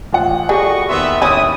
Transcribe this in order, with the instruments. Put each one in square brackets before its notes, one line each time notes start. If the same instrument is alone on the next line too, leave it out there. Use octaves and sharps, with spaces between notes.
[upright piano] A1 F4 F#5
[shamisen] G3 G#4 [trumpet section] F#4 D#5 C#6 [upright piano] A4
[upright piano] D#2 C6 [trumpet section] B3 E5
[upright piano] D#2 D#7 [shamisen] C#4 E4 [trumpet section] D#6